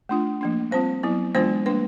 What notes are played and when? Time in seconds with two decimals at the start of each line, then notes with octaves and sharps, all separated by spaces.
0.09 A3 D4 F4
0.41 F3 A#3 D4
0.71 G3 C4 F4 C5
1.03 F#3 B3 E4
1.35 E3 G#3 B3 D4 F4 C5
1.66 G3 A#3 D4 B4